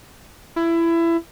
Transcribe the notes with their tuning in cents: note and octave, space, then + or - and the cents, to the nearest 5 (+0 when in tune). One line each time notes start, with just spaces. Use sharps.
E4 +20